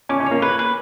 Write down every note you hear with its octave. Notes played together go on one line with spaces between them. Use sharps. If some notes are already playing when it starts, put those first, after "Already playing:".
C#4 D6
C#4
C#5
A#3
B4
B4